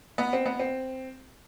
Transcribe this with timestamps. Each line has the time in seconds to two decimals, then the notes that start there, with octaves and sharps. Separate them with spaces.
0.18 B3
0.33 C4
0.46 B3
0.59 C4